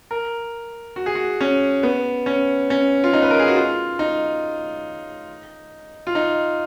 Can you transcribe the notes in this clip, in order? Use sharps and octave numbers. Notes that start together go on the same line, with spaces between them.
A#4
F#4
G#4
F#4
C#4
B3
C#4
C#4
F4
D#4
B4
A#4
G#4
F#4
F4
D#4
F4
D#4